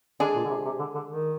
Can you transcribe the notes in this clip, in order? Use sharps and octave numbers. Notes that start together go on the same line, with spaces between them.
D3 G#3 D4 G#4
A#2
D3
C3
C3
D3
D3
D#3